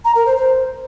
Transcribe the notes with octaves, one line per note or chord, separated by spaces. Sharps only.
A#5
A#4
C5
C5